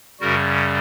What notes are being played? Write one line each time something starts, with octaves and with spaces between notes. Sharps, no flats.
F#2 C#3 G3 F#4 A#4